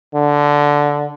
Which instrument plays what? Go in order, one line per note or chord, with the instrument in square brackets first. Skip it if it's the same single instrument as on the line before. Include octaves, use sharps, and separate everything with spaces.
[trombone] D3